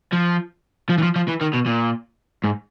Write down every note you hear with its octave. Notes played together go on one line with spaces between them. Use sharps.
F3
F3
E3
F3
F3
E3
D#3
B2
A#2
G#2